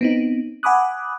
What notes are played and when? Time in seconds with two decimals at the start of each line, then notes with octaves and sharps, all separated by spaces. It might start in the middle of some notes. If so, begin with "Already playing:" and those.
0.01 B3 C4 D#4
0.63 F#5 G#5 B5 D6 D#6 F#6